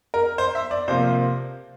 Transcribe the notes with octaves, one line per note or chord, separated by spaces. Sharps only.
A#4
C5
E5
D5
C3 F3 A#3 C5